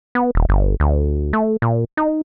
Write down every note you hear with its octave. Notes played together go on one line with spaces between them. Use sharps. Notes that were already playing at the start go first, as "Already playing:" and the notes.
B3
D#1
G1
D2
A3
A#2
D#4